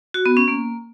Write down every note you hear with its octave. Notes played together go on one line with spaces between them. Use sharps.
F#4
B3
C#4
A#3